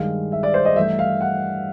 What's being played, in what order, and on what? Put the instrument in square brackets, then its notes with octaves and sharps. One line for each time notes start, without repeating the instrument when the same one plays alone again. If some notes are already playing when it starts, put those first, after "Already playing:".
Already playing: [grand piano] G2 D#3 G#3 F5
E5
D5
C5
D#5
G2 E3 A3 E5
F5
F#5